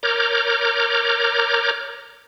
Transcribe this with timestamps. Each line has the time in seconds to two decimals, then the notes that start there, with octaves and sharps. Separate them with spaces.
0.03 A#4 C#5 A#5 D6 F6 G6